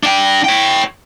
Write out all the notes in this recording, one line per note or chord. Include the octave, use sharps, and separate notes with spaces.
D4 G5
C#5 G5